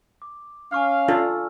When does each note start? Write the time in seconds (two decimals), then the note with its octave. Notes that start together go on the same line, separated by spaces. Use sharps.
0.22 D6
0.72 C#4 F5 G#5 C#6 F6
1.08 D4 F4 A4 E6 F6